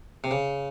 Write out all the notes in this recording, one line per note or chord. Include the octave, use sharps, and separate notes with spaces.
C3
C#3